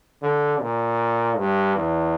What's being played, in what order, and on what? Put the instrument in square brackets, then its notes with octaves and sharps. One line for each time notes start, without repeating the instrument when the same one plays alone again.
[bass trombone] D3
A#2
G2
E2